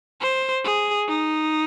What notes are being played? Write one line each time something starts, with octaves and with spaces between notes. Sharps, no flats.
C5
G#4
D#4